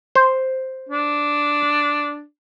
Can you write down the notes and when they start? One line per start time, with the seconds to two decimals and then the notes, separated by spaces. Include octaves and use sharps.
0.15 C5
0.89 D4